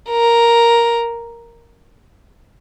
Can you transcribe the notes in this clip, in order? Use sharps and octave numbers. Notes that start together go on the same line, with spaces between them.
A#4